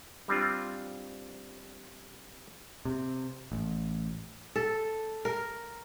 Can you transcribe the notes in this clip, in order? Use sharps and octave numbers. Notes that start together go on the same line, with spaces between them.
G3 C4 D4 F4
C3
A1
A4
A#4